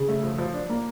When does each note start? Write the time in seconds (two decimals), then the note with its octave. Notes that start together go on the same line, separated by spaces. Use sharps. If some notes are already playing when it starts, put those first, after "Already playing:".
Already playing: C#3
0.08 A3
0.23 F3
0.38 F3
0.53 D4
0.69 A#3